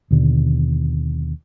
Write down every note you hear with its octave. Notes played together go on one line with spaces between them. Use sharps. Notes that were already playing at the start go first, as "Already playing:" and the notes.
D#2 B2 D3